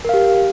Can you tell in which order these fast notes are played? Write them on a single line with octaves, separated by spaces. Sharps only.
A#4 F5 G4